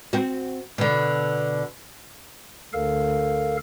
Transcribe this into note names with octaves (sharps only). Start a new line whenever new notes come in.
C4 F#4
B2 D3
D2 A4 A#4 F5